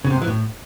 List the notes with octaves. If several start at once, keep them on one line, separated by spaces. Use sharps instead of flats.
C#3
C3
G#2
E3
A2